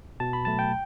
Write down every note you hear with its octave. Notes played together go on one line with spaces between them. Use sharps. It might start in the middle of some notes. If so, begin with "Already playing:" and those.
B2 A5
B5
F#3 A3 A5
G5